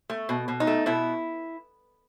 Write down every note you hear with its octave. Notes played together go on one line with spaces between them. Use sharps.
A3
B2
B2
D#4
A3
B2 E4